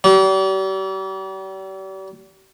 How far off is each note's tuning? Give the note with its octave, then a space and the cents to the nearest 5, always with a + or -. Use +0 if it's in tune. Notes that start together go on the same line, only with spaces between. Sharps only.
G3 -40